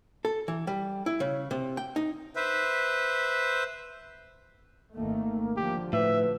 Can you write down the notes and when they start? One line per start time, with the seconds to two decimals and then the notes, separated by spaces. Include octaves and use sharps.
0.25 A4
0.48 E3
0.67 G3
1.06 E4
1.20 C#3
1.51 C3
1.77 G5
1.96 D#4
2.36 B4 C5 E5
4.94 G#1 D#3 A3 A#3
5.57 D3 F3 G4
5.93 A2 B4 E5